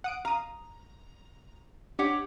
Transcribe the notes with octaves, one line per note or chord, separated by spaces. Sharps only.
F#5 D#6 D7
F5 A#5 D#6
D4 G4 C#5 F#5